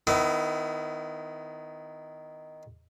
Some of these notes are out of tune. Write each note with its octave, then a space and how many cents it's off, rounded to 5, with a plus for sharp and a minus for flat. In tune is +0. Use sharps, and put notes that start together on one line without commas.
D#3 +0 B3 +35 E4 +0